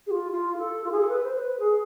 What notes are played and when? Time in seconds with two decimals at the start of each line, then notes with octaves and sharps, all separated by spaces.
0.06 G#4
0.11 F4
0.32 F4
0.57 A4
0.84 F4
0.92 G#4
1.00 A4
1.08 B4
1.23 C5
1.34 C5
1.38 B4
1.59 G#4